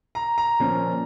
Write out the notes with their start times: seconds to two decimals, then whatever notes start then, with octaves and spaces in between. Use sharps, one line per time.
0.15 A#5
0.38 A#5
0.60 A#2 F3 C#4